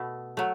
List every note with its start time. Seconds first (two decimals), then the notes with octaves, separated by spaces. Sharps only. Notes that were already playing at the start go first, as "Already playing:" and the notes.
Already playing: B2 A3
0.37 F#3 A3